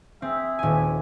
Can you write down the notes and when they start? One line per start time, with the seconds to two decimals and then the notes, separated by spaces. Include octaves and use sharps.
0.22 C4 G#4 E5
0.59 D#1 G#5